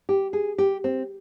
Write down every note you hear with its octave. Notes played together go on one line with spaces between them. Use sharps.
G4
G#4
G4
C4